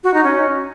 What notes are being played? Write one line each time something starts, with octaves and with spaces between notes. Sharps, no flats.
F#4
D#4
C#4